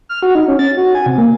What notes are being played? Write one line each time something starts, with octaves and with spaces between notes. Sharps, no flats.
F6
F#4
D#4
C#4
A6
F#4
G#5
C3
A#3